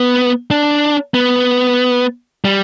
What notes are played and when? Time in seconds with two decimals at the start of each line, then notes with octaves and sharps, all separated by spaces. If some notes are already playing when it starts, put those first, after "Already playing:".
Already playing: B3
0.51 D4
1.14 B3
2.45 G3